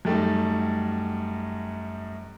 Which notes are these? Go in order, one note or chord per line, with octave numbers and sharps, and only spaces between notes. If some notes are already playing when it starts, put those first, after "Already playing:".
F#2 G3 A3 D#4